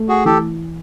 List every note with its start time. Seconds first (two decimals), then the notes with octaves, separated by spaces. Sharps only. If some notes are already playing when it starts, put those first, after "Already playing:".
Already playing: A3
0.09 F#4 G#4
0.25 E3 G4 A4